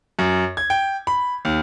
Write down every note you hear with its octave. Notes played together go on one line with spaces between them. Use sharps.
F#2
G#6
G5
B5
D#2